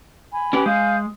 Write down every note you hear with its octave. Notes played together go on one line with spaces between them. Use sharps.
G#5 B5
C#4 G4 B4
G#3 F5 G#5 G6